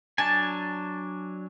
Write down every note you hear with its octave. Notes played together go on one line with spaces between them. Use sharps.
F#3 D4 G#5 A5